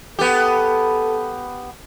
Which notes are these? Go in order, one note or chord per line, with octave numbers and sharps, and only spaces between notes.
B3 G4 A4